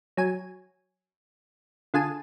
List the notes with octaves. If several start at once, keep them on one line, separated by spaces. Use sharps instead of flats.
F#3 G#5
D3 F4 G#4 G#5 A5